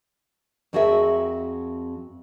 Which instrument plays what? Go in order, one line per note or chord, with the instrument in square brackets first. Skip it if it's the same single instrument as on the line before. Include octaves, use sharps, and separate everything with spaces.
[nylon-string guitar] F2 C4 F#4 G#4 A#4 E5